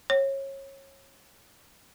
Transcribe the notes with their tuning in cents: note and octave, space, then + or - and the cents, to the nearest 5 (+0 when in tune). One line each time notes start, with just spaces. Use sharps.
C#5 -25